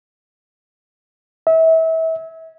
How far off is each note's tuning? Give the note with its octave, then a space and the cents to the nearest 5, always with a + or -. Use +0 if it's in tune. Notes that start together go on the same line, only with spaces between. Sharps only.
E5 -30